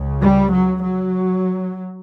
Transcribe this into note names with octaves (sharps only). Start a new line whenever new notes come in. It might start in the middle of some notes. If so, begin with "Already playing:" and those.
Already playing: C#2 C#3
G3
F#3
F#3